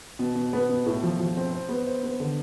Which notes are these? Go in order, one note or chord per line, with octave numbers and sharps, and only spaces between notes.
B2
B2
B3
B2
A2
F3
F3
C4
C5
B3
C5
B3
D3